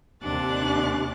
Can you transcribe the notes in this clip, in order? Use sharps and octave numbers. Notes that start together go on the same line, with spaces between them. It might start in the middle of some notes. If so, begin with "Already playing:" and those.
D#2 C3 D4 G4 F#6 A6